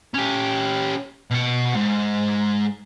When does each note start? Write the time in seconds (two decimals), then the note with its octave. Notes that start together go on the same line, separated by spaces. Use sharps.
0.14 C#4 G4
1.31 B2 F#5
1.75 G#2